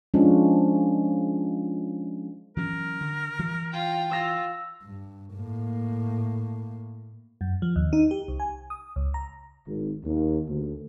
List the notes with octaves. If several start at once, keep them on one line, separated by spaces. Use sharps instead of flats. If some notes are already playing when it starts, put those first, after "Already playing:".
F3 G#3 C#4 D4 F4
E3 F#3 C#4 A#4
D3
E3
F4 G5
F4 E6 A#6
G2
A2 A#3
F#2
F3
D#2
D#4
G4
C2
G#5
D#6
C#2
A#5
G#1
D#2
D2